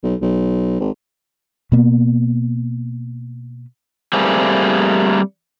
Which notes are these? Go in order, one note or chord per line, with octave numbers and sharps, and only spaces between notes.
B1
B1
G#1
B2 A#3 B3
G3 A3 A#3 C4 G#4